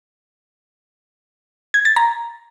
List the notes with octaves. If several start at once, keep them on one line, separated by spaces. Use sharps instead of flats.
G#6
A6
A#5